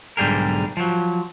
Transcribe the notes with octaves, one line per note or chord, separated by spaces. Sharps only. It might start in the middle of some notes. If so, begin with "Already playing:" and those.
B1 G#2 D3 G3 G#4 A#4
F3 F#3